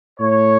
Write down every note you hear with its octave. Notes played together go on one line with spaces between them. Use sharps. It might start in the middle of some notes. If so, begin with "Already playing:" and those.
A2 A3 C#5